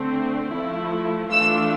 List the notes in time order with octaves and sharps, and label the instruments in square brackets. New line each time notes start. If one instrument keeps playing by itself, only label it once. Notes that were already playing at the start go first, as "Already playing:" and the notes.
Already playing: [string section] D3 A3 C4
F3 A3 E4
E3 A3 D4 F4 E6